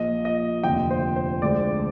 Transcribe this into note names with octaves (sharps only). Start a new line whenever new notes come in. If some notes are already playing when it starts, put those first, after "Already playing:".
Already playing: A#1 A#2 F3 D#5
D#5
F1 D#2 D3 F3 G5
C5
C5
D2 D3 G#3 D5